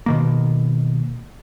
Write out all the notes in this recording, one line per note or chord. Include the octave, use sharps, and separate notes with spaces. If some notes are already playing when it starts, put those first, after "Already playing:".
B2 D#3 A#3